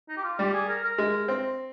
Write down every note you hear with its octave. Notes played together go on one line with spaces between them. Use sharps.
D#4
G4
F4
G3 G4
G#4
A#4
A#4
G#3
C4